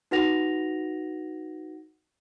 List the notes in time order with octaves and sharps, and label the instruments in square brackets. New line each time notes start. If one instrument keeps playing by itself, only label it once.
[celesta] D#4 F#4 B4 F#5 A#6 F7